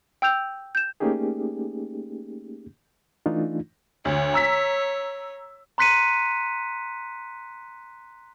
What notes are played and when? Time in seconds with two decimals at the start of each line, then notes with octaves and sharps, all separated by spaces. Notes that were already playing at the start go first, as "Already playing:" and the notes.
0.22 G5 E6 G6 F7
0.75 G6 E7
1.00 A3 A#3 C#4 D#4 G4 G#4
3.26 E3 A3 D4 D#4 F4
4.05 D2 C#5
4.34 A#5 E6 B6
5.78 A#5 C6 F#6 B6 C#7 D#7